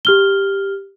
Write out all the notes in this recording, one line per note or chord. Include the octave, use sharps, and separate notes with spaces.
G4 F6 G7